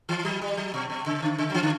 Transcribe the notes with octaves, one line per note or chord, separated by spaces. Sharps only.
E3
F#3
G3
F#3
B2
B2
C#3
D3
C#3
F#3
E3
D3